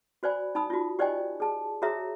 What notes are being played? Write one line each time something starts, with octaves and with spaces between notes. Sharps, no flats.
F#4 C5 D5 G#5 B5
D#4 A5 B5 D#6
F4 F#4
G4 C5 D5 D#5 G5 G#5
G#4 A5
F#4 G#4 A#4 C#5 E5 A#5